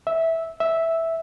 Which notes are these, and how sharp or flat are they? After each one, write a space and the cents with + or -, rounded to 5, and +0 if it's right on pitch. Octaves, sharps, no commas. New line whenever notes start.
E5 -10
E5 -5